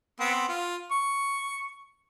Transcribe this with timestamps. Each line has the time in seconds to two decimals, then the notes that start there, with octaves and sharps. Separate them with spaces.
0.20 B3 C4
0.49 F4
0.91 C#6